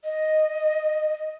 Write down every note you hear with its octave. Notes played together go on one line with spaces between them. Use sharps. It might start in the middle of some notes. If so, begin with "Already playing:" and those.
D#5